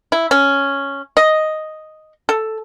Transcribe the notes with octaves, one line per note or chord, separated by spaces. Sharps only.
E4
C#4
D#5
A4